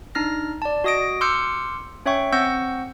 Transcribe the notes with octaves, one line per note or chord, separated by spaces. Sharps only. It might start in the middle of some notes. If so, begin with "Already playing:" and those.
D4 D#4 F6 A#6
D5 A5
F#4 D#5 D#6 A#6 D7
C6 D6 E6 F6 G6 C#7
C#4 C#5 E5 G5 C#6
C4 F#5 C#6 E6 G6 A#6